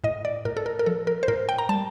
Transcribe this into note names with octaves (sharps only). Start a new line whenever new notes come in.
A2 D#5
D5
A2 A#4
A4
A#4
A#4
F3 A4
A#4
C5
A2 A#4
G5
A#5
G3 A5